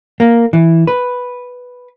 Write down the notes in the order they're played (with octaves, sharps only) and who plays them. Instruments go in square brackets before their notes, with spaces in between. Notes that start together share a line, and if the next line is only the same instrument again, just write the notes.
[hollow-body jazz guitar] A#3
E3
B4